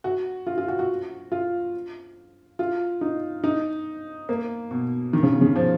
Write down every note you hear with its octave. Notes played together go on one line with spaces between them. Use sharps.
F#4
F4
F4
F#4
F#4
F4
F4
D#4
D#4
A#3
B2
D#3
C#3
B2
C#3
F3